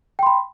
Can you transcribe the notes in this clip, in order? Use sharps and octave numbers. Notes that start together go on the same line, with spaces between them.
G5 B5 C6